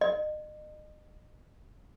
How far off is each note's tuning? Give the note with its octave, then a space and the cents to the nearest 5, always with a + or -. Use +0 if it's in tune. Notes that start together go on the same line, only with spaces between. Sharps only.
D#5 -35